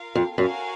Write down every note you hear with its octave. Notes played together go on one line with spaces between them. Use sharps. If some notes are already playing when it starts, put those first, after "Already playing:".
Already playing: F4 A#4 F5
F2
F#2 F#4 A#4 F5 G#5